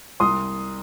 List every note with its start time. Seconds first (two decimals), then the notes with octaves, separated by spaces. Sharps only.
0.20 C2 C6 D#6